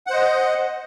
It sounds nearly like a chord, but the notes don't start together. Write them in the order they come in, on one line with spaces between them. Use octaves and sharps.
F#5 C5 D#5